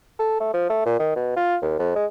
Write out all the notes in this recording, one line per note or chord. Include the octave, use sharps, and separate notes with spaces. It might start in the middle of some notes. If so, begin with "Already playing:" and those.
A4
A3
F3
A3
A#2
D#3
B2
F4
D#2
F2
G#3